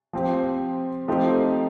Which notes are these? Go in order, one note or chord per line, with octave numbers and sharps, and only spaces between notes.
F3 C4 G4
F3 A3 C4 D#4 G4